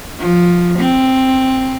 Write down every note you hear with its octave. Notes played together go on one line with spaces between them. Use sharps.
F3
C4